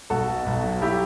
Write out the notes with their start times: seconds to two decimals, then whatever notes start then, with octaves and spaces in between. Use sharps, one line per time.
0.10 B1 F#4 A4
0.29 B2
0.46 B1
0.63 F#3
0.82 E4 G4